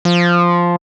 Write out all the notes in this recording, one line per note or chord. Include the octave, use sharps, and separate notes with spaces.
F3